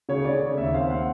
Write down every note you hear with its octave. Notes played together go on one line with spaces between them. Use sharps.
C#3 C#5
C#3 D5
C#3
D#2 E5
C4 F5
F#5